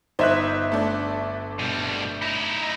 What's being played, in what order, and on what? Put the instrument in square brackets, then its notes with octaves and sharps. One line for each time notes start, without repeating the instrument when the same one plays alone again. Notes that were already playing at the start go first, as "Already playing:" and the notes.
[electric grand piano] G1 E5 F#6 [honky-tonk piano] D#4 C5
[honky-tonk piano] A3 D4
[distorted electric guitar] B2 G3
D#4 E4